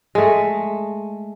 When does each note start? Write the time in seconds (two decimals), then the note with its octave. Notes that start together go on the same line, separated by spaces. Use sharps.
0.15 G#3 A3